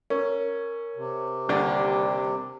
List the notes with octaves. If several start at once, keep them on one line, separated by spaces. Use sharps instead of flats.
C#4 A#4
C3
D#2 D3 G3 D4